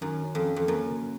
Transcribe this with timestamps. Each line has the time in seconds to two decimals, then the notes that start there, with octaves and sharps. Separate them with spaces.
0.01 F#2 D#3
0.24 C#4
0.35 F2
0.45 C#4
0.56 F2
0.67 F#2 A#3
0.90 C#3